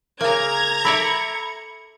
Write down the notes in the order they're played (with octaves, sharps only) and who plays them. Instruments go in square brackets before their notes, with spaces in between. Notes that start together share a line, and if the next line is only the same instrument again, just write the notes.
[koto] C#3 A#3 [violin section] A#5 G#6
[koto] A4 D5 E5 [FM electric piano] B5 C#7